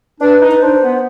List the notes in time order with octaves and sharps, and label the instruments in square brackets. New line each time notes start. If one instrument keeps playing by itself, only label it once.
[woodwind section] D4 [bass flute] B4
[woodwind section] D#4
[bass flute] B4
[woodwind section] D4 [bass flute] C5
[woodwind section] B3